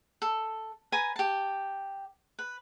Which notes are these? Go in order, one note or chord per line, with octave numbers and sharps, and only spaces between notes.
A4
B4 G#5 A#5
G4 A5
B4